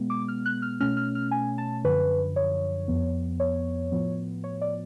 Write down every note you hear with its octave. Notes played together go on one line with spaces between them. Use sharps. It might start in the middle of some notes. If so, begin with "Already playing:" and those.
Already playing: B2 G#3 B3
D6
F6
F#6
F6
B2 A3 C#4 F6
F6
F6
G#5
A5
F#2 D3 F3 B4
C#5
F2 F3 B3
C#5
A2 F3 B3
C#5
D5